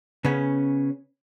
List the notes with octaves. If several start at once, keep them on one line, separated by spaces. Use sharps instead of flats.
C#3 B3 C#4